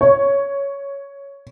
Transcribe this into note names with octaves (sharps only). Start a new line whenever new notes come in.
C#5